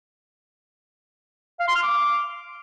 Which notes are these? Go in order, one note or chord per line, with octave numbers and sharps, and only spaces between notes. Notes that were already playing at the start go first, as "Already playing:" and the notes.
F5
C6
F6
D6